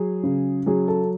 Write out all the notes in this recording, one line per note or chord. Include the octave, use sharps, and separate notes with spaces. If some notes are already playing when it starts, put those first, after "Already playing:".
Already playing: F#3 G#4
C#3
F#3 G#4
A4